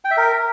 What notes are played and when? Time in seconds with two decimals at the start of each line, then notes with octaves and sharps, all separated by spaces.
0.05 G5
0.11 E5
0.17 A#4